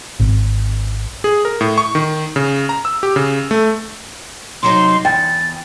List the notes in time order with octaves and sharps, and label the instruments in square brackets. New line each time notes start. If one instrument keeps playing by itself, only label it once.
[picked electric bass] G#1
[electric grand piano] G#4
A#4
A2
C#6
D#3
C#3
A#5
E6
G4
C#3
A3
[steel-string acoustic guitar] C3 F#3 D#4 [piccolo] C6
[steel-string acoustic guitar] E2 [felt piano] G5 [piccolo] A6